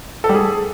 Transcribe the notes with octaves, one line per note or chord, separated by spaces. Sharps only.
A4
G3
G#4